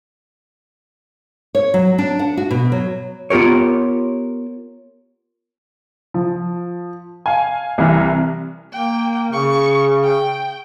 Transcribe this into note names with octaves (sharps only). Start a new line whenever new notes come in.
C#5
F#3
D4
F#5
F#4
B2
F#3
B3 F4 G4 A#4 C#5
F3
F5 G#5
C2 E3 F6
A#3 G5
C#3 C#6
G5